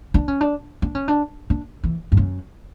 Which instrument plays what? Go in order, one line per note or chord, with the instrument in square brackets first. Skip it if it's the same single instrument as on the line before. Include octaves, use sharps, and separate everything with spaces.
[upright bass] D4
C#4
D4
D4
C#4
D4
D4
E3
G2
F#2